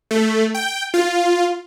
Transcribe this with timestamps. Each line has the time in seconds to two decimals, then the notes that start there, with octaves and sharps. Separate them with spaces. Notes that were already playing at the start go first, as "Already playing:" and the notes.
0.11 A3
0.55 G5
0.94 F4